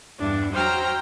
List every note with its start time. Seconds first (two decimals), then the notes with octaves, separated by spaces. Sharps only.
0.19 E2 G2 D4
0.52 F#3 C5 G5 A#5 F6